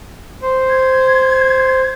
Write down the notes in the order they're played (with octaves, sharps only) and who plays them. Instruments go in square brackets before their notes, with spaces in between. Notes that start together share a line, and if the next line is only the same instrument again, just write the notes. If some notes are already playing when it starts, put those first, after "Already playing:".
[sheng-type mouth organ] C5
[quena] G#6